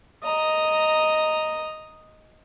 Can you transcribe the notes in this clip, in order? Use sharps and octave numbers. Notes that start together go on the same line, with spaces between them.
D#5 A#5